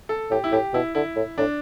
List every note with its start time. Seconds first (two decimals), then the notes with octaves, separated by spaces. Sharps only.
0.09 A4
0.31 A2 G4
0.44 E4
0.52 A2 G4
0.74 B2 E4
0.95 D3 E4
1.16 A2
1.38 A2 D4